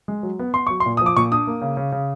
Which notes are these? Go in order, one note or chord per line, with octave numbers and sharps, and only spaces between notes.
G#3
F#3
B3
B3 C6
F#3 C#6
C6
A#2
F3 D#6
D6
A#2 C#6
D4 D#6
A#3
C#3
C#3
C#3